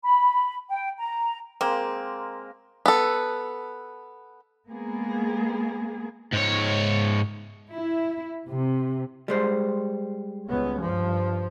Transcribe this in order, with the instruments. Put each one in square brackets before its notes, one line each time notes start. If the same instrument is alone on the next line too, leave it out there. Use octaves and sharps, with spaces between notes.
[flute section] B5
G5
A#5
[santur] G#3 A#3 A#4 [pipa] C4
[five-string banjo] B3 A4
[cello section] G#3 A#3 B3 G#4
[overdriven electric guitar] G#2 C#5
[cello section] E4
C3
[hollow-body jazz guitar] G3 G#3 C5
[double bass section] C#2 B3 C#4
G2 F3